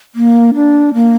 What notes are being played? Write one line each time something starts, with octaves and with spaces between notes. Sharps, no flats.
A#3
D4
A#3